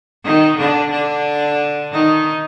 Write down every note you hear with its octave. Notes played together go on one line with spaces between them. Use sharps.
D#3 D#4
D3 D4
D3 D4
D#3 D#4